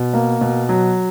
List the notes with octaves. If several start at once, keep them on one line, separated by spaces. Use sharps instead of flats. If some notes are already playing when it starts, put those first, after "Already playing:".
Already playing: B2
A#3
B2
F#3